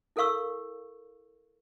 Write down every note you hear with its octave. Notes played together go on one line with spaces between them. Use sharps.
E4 A4 A#4 F5 C#6 E6